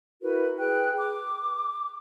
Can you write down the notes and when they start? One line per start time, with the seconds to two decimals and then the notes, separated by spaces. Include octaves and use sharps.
0.21 E4 F#4 A#4 B4
0.58 G#4 B4 G5 F#6
0.99 D6